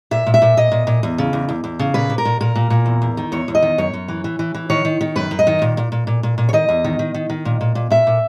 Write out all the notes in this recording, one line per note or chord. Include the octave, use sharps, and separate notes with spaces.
A#2 E5
A#2
E5
A#2
A#2 D#5
A#2
A#2
E2
C#3
E2
E2
E2
C#3
A#2 B4
A#2
A#4
A#2
A#2 A#4
A#2
A#2
E2
E2
D#3
E2 C#5
E2
D#5
D#3
F#2 C#5
F#2
E3
E3
E3
E3
D#3 C#5
D#3
D#3
F#2 B4
F#2
D#5
D#3
A#2
A#2
A#2
A#2
A#2
A#2
C#5
D#3 D#5
E2
D#3
D#3
D#3
D#3
A#2
A#2
A#2
A#2 E5
A#2